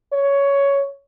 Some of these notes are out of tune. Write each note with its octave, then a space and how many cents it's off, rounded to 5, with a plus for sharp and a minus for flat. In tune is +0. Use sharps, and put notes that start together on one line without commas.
C#5 +10